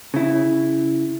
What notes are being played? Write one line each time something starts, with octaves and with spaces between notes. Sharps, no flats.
C#3 E4